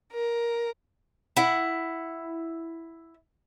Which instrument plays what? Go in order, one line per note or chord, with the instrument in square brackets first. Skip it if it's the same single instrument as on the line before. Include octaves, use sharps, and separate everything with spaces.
[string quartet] A#4
[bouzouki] E4 F#5